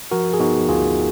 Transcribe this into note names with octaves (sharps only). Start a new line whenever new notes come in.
F3 F#4 A#4
G#4
B3 D#4 F#4
D2 F4 G#4